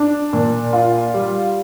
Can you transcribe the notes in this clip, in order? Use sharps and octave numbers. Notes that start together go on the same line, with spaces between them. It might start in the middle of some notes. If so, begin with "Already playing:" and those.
Already playing: D4
A#2
F4
G3